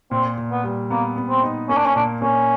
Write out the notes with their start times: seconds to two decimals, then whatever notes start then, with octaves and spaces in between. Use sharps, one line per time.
0.11 A#2 C4
0.38 A#2
0.51 B3
0.63 G3
0.90 A#3 B3
1.16 B3
1.29 C4
1.42 D#4
1.69 A#3 C#4
1.77 D4
1.86 C#4
1.96 A#2 D4
2.22 A#3 C#4